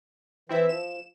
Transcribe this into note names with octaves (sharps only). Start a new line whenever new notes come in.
E3 C4 E4 E5
F3 E7